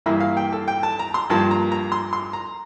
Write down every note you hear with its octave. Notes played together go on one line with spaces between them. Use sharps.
G2 E3 A#3 E5
F5
G5
A4
G5
A5
A#5
C6
G2 F3 A#3 A5
A#5
A#5
C6
C6
A#5